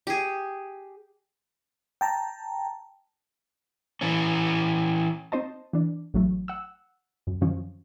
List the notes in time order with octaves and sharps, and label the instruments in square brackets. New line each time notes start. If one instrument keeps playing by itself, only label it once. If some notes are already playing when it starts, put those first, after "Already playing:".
[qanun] G4 G#4
[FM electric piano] G5 A5 A#5
[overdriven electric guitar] E3 C#4
[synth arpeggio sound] C4 D#4 C5 D#5 A5
E3 D4
A1 F#3 A3
F#5 E6
F#2
F#2 D#3 F3 C#4